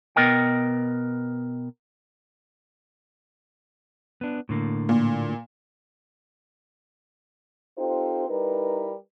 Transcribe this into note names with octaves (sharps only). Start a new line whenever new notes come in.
B2 G#3 B3 A#4 D#5 G5
B3 D4
A2 D3 A#3
A#2
C4 D#4 F4 G4 A4 C5
G3 D#4 E4 A#4 B4